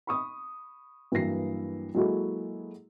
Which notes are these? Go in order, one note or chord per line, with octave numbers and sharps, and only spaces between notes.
B5 C#6 D#6
G2 E3 F#3 A#3 A#6 C7
F#3 G#3 A#3 E4 F#4 A4